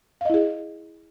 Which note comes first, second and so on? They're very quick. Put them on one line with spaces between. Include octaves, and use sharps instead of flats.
F5 D#5 E4 G#4